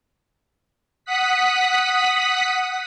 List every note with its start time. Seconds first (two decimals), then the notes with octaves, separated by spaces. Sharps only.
1.05 F#5 D#6 F#6 B6